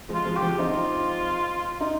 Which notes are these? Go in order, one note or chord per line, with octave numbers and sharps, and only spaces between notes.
F3 G#3
F4
F3 G#3
G4
F3 G#3
C4 D#4 F4
D#4